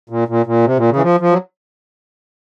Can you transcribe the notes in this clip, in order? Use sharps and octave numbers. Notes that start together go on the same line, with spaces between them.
A#2
A#2
A#2
C3
A#2
C#3
E3
F3
F3
F#3